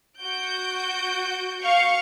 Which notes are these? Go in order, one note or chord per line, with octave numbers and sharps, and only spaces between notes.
F#4 G6 D7
F5 C#6